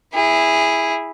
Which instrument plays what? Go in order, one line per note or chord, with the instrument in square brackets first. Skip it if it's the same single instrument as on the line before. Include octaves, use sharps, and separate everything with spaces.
[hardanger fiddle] E4 G#4